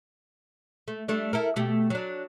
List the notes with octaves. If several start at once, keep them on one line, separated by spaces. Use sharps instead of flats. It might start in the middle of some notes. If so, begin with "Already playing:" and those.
A3
G3 A3 D4
E4 A4 A#4
B2 A3 G4
F#3 D4